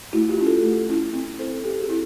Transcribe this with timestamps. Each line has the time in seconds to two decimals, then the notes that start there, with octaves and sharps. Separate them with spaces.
0.13 A3 E4 F#4
0.29 F4 G4
0.38 C#4 E4
0.46 G4 A4
0.63 A3
0.89 C#4 E4
1.13 C4
1.39 E4 A4 C5
1.64 C4 G4 A4
1.81 F#4 G#4
1.89 E4